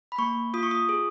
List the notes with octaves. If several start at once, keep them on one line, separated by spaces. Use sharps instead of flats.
B5
A#3 C#6
F4 D#6
C#6
D#6
G#4